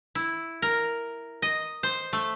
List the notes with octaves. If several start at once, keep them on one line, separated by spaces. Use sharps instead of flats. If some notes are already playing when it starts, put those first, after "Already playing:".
E4
A#4
D#5
C5
A3